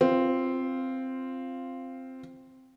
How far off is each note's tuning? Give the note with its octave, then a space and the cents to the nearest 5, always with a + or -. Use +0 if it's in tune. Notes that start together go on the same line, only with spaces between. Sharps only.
C4 +0 F4 -5